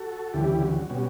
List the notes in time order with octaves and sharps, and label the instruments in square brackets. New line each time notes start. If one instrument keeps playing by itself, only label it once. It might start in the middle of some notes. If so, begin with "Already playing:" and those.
Already playing: [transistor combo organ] F#4 A4
D2 C#3 E3 G3 E4 G4
F#4
B2 G3 C#4